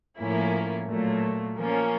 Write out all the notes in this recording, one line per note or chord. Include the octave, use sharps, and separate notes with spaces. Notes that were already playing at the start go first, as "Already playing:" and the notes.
A2 F3 A#3 C#4 E4
A#2 F#3 A3
F3 A#3 C#4